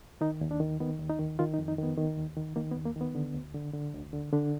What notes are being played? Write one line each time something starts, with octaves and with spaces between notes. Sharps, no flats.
D#3 D#4
D#2
D4
D#3
D#3 B3
D#2
D#4
D#3
D#3 F4
D#4
F2
D#4
D#3 B3
D#3
D#2
D#3
D#3 A#3
B3
D#2
A#3
D#3
B3
D3
D2
D3
D3
D2
D3
D3 D4